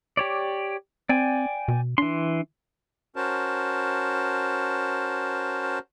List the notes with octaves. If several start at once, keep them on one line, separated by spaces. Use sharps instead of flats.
G4 C#5 D5
C4 D5 G5 G#5
B2
E3 D4 C6
C#4 F#4 A#4 C5 A5